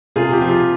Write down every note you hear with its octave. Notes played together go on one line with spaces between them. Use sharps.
C3 F4 G#4
G4
F3
F4